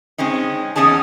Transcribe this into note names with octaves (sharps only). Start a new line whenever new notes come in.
G#3 C4 C#4 D#4
E2 C#4 D#4 G#4 A5